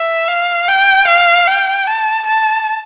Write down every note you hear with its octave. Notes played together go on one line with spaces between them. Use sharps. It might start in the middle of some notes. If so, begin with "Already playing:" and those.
Already playing: E5
F5
G5
F5
G5
A5
A5